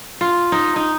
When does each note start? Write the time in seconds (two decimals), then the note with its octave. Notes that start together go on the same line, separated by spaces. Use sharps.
0.21 F4
0.52 D#4
0.76 D#4